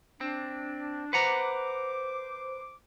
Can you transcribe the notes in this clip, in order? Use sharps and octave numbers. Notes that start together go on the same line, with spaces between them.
C4 D4
B4 C5 F#5 A#5 D6